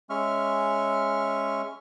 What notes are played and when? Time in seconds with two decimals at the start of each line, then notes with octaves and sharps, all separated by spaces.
0.10 G#3 C#4 E5 C#6 F6